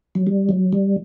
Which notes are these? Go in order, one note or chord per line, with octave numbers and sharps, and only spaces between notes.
F#3
G3
F#3
G3